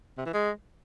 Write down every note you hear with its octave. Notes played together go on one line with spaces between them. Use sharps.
C3
E3
G#3